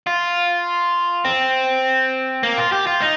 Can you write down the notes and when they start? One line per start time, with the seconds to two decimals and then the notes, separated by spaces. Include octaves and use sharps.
0.07 F4
1.25 C4
2.43 A#3
2.58 F4
2.72 G4
2.87 F4
3.01 D#4